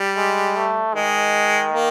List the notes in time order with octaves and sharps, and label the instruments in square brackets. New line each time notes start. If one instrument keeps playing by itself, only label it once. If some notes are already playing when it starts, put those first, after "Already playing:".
Already playing: [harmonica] G3
[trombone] G#3
A3
[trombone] D#3 [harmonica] G#3
[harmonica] A#3